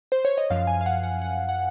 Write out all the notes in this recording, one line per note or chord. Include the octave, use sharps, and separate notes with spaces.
C5
C#5
D#5
F#2 F3 F5
G#5
F5
F#5
F#5
F#5
F#5